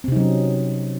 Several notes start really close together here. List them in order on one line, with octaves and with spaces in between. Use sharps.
C4 C3 D#4 F#3 C#4